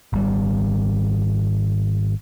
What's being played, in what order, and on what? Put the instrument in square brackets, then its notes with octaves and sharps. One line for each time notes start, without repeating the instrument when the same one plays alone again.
[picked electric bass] G#1 G3